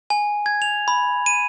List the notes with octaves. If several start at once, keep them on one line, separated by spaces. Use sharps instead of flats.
G#5
G#6
F7
B5
D#7